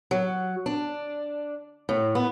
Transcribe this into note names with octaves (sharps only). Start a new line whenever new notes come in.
F#3
D4
A2
B3